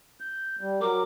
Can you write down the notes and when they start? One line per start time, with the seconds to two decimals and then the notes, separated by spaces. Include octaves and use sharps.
0.20 G6
0.61 G3
0.81 F#3 A#4 D6